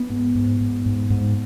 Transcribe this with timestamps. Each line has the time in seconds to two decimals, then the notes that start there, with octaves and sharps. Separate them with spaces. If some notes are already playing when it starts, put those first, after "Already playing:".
Already playing: B3
0.10 G#2
0.35 G#2
0.60 G#2
0.86 G#2
1.10 G#2